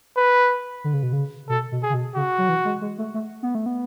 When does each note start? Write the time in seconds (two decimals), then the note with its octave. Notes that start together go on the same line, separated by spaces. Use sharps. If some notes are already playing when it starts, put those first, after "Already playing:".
0.17 B4
0.84 D3
0.93 C#3
1.03 B2
1.13 C#3
1.49 B2 A4
1.72 B2
1.83 G#4
1.90 C#3
1.94 B2
2.16 C#3 F#4
2.38 F#3
2.49 E3
2.65 G#3
2.81 G#3
2.98 A3
3.14 A3
3.43 B3
3.55 A3
3.66 B3